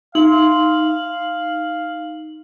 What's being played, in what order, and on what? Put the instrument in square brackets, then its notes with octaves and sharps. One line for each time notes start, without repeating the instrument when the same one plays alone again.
[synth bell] D#4 F#7 [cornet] F5 [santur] C6